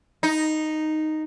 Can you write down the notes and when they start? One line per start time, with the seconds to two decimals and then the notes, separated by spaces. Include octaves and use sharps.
0.23 D#4